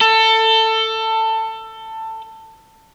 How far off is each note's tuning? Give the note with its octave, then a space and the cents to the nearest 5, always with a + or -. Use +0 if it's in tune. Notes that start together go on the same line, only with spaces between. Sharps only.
A4 +20